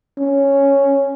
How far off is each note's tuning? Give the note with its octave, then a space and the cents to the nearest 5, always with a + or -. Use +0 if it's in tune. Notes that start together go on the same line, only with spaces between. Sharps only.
C#4 +0